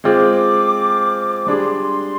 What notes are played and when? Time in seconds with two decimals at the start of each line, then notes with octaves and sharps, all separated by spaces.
0.04 G#3 C4 F4 G#4 D6
1.47 G3 D4 G#4 C6